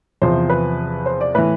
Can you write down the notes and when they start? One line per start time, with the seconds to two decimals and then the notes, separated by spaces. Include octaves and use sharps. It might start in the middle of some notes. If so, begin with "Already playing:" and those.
0.22 E2 C3 F3 C5
0.50 B4
1.06 C5
1.21 D5
1.35 A2 E3 B4